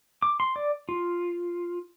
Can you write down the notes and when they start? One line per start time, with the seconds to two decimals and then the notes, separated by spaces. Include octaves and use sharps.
0.22 D6
0.40 C6
0.56 D5
0.89 F4